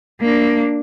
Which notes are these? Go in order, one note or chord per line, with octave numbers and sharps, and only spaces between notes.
A#3 D4